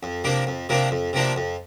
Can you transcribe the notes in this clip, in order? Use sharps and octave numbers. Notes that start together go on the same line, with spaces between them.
F2
C3 F3 A#3 D4
F2
C3 F3 A#3 D4
F2
C3 F3 A#3 D4
F2